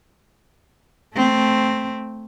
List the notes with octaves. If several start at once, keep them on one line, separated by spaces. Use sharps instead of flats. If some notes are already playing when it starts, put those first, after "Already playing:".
A3 C4